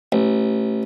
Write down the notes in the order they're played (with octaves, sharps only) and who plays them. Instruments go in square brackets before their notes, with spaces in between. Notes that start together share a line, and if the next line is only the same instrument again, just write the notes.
[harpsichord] A1